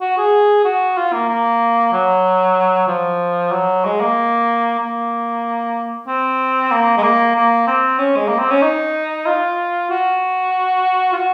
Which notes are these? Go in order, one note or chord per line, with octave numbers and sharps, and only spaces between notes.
F#4
G#4
F#4
F4
A#3
A#3
F#3
F3
F#3
G#3
A#3
A#3
C4
A#3
G#3
A#3
A#3
C4
C#4
G#3
A#3
C4
C#4
D#4
F4
F#4
F4
F#4